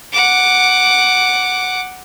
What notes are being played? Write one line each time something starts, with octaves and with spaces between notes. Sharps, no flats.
F#5 D6